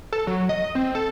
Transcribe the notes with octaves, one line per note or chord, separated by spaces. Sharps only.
A4
F#3
D#5
C4
A4